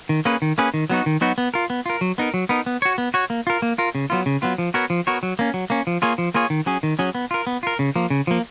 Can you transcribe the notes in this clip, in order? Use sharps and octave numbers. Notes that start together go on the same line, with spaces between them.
D#3
A#3 C#4 G#4 B4
D#3
A#3 C#4 G#4 B4
D#3
F#3 B3 D#4 F#4
D#3
F#3 B3 D#4 F#4
B3
F4 A#4
B3
F4 A#4
F#3
B3 D#4 A#4
F#3
B3 D#4 A#4
B3
F#4 C#5
B3
F#4 C#5
A#3
F4 A#4
A#3
F4 A#4
C#3
F#3 B3 F4
C#3
F#3 B3 F4
F3
B3 F#4 A#4 C#5
F3
B3 F#4 A#4 C#5
F#3
A#3 C#4
F#3
A#3 C#4
F3
A#3 F4 G#4 C#5
F3
A#3 F4 G#4 C#5
D#3
F#3 C#4 G#4
D#3
F#3 C#4 G#4
B3
F4 A#4
B3
F4 A#4
C#3
F3 A#3
C#3
F3 A#3